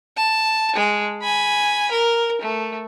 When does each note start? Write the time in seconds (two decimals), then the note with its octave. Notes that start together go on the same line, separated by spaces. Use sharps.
0.17 A5
0.76 G#3
1.22 G#5 B5
1.91 A#4
2.41 A3